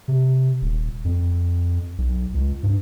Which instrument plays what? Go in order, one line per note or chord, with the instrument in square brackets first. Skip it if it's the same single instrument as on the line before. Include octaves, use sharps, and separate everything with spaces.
[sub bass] C3
D#1
F2
B1
C#2
G2